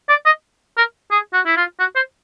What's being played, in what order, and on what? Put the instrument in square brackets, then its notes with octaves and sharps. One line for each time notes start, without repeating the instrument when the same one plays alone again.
[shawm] D5
D#5
A#4
G#4
F#4
E4
F4
F#4
C5